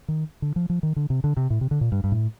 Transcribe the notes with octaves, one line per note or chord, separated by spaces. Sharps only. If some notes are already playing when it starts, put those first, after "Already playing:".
D#3
D3
F3
F3
D#3
D3
C3
D3
C3
A2
C3
D3
A#2
G2
G2
A2